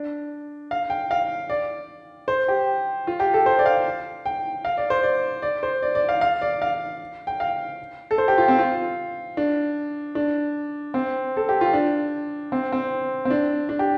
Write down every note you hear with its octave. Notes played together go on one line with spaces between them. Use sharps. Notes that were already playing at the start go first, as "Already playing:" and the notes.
Already playing: D4
F5
G5
F5
D5
C5
G4
F4
G4
A4
C5
D5
F5
G5
F5
D5
C5
D5
D5
C5
D5
D5
F5
F5
D5
F5
G5
F5
A4
C5
G4
F4
C4
F4
D4
D4
C4
A4
G4
F4
D4
C4
C4
C4
D4
D4
G4